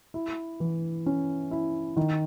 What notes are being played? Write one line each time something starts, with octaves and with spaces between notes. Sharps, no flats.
E4
E3
C#4
E4
D#3